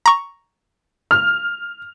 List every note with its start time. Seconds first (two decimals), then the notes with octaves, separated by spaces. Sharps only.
0.06 A#5 C#6
1.11 F6